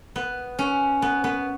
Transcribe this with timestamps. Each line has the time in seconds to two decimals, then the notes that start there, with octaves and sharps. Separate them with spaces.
0.16 B3
0.59 C#4
1.02 B3
1.24 B3